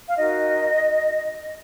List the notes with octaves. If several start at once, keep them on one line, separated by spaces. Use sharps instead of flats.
F5
D#4 F#4 A#4 D#5